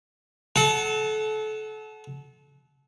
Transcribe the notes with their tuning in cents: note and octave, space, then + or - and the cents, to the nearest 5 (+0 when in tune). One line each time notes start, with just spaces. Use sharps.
A4 -30 F#5 +10 A5 +25